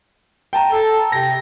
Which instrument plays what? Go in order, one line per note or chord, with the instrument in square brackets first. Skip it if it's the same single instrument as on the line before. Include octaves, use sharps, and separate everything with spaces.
[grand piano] G5 A5 A#5
[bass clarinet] A4
[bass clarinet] C3 [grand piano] G5 A#6